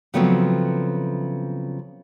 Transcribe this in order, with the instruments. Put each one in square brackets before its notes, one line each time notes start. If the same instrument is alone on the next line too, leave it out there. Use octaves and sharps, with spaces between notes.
[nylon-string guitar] C#3 F3 F#3 A3 B3 C4